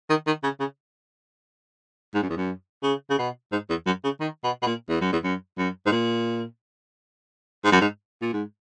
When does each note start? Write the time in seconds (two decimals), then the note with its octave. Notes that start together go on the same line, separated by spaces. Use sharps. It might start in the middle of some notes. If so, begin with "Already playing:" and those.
0.10 D#3
0.27 D#3
0.43 C#3
0.60 C#3
2.14 G#2
2.22 F#2
2.30 E2
2.37 F#2
2.83 C#3
3.10 C#3
3.18 B2
3.52 G#2
3.70 E2
3.86 F#2
4.04 C#3
4.20 D#3
4.44 B2
4.62 B2
4.66 A#2
4.89 E2
5.01 F#2
5.12 E2
5.24 F#2
5.58 F#2
5.86 G#2
5.92 A#2
7.64 G#2
7.72 F#2
7.81 G#2
8.22 A#2
8.33 G#2